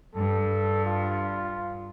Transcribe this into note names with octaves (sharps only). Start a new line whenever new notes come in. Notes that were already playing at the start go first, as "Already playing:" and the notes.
G2 A4
F4